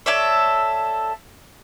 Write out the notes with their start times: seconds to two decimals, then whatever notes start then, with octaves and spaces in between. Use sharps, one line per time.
0.06 A4 C#5 D5 E5